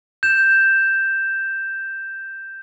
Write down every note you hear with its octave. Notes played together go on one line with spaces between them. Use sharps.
G6 E7